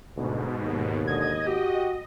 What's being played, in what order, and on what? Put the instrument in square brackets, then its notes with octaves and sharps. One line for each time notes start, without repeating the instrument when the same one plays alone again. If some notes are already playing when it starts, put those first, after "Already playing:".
[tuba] D2 [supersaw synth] G#2 B2
[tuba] D#2
[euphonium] D3 [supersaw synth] D#5 [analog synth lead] G#6
[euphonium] F#4 [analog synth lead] G4